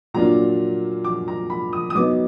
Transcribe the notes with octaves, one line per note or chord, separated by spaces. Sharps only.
A#2 F#3 D4 F4 A#5
D6
A#5
B5
D#6
D#6
F#3 B3 D#4 D6